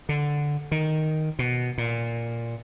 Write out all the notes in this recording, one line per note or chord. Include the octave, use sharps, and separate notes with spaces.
D3
D#3
B2
A#2